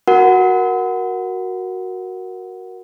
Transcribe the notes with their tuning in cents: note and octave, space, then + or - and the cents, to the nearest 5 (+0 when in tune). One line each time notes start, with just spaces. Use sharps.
F#4 +0 A#4 +5 F#5 +0